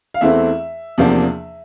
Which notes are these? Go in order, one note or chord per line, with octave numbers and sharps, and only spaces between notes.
F5
E2 E3 A3 C4 E5
E2 C3 F3 A#3 D4